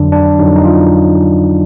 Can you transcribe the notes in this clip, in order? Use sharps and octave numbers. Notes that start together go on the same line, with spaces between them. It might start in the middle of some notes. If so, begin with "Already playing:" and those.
Already playing: F2 D3 F#3 D4
D4
F2 D3 F#3 D#4
D#4
F4